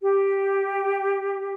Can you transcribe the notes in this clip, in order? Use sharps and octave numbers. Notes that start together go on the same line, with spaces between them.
G4